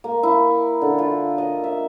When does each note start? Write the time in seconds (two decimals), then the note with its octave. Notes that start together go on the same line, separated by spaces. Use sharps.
0.04 A#3
0.23 E4
0.82 D3
0.98 F4
1.38 D#5
1.64 E5